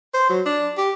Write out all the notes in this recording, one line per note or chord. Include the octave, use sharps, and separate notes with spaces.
C5
F#3
D4
G4